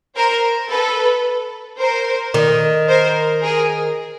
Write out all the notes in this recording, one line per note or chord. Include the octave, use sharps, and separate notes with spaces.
A#4 C5
A4 B4
A#4 C5
D#3
A#4 C5
G#4 A#4